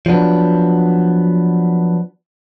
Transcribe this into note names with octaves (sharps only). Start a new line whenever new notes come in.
F3 F#3 B3 D4